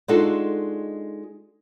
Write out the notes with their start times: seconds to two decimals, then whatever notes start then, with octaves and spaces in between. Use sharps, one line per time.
0.08 G#3 D4 D#4 F4 F#4 A4